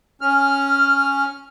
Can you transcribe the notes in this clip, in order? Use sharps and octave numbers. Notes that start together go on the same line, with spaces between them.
C#4 F6